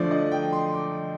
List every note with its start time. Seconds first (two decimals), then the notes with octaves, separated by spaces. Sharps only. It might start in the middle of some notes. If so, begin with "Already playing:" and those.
Already playing: D3 F3 A3 D5
0.11 D#5
0.32 G5
0.52 C6
0.74 D6